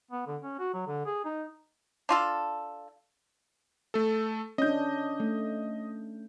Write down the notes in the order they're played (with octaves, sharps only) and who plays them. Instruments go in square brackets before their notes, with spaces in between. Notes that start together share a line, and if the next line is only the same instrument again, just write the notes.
[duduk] B3
D3
C#4
F#4
F#3
D3
G#4
D#4
[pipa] D4 F4 A4
[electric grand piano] A3 A4
[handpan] C#4 D4 [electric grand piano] D#5 G6
[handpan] A3